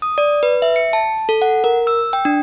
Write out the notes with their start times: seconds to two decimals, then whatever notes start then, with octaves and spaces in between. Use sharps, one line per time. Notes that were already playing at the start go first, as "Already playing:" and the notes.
0.02 D#6
0.18 D5
0.43 B4
0.62 E5
0.76 C#7
0.93 A5
1.29 A4
1.42 F#5
1.64 A#4
1.87 E6
2.13 G5
2.25 D4